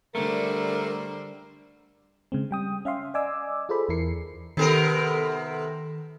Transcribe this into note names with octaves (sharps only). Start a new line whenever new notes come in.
D3 G3 A3 A#4 C5
C#3 G#3 C4
G3 G5 D#6
C#4 E5 F5 C6
D5 D#5 G#5 D6 E6
F4 G#4 A4 C5 B5
E2 E3 E4 A#4 C7 C#7
C3 D#3 B3 A4 A#4